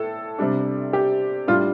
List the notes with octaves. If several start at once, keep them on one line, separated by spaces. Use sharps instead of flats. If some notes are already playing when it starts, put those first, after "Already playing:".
Already playing: A2 A4
C3 G3 D4
G4
A2 G3 D4 F4